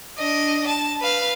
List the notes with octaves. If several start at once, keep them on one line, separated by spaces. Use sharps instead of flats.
D4 D#5
A5
B4 F5